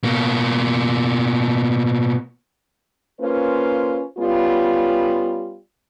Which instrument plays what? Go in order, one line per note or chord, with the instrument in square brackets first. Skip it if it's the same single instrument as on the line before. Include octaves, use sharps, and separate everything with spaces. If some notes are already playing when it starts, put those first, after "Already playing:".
[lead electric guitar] B2 A#3
[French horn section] A#3 C#4 F4 B4 C5
G3 B3 C#4 F4